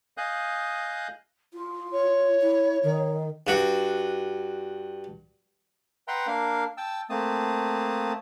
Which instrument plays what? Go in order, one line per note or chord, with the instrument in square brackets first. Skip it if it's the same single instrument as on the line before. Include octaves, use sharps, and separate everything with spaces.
[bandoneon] D#5 F5 G#5 D#6 F#6 G6
[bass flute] F4
[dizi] C#5
[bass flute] E4
D#3
[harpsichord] G2 F#4
[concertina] B4 E5 F#5 G5 A#5 C6
A#3 D4 A#4 F5
G5 A5 E6
A3 A#3 C4 A5 D#6